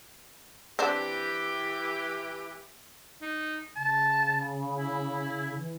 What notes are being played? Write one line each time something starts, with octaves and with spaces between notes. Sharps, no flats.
E3 C4 D4 G4
D#4
C#3 A5
E4
E3